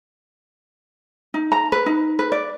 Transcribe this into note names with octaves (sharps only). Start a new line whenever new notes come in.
D#4
A#5
B4
D#4
B4
D5